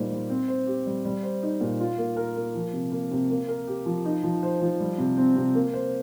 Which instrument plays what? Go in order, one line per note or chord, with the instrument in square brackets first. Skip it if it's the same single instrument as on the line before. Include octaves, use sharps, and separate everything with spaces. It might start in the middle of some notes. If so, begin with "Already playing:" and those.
Already playing: [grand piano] A#2 G3 D#4 C5
G3
C4
C5
G4
G3
G3
C5
D#4
A#2
F4
A#3
A#4
A#3
F3
C3
A#3
C3
A#3
A#4
G4
F3
D#4
F3
C5
F3
G3
C3
C4
C3
A#3
C5